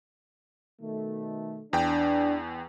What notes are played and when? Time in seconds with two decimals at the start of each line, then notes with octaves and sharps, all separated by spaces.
0.81 B2 D#3 A3
1.73 E2 D4 G5